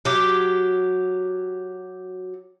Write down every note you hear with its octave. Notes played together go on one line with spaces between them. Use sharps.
F#3 G4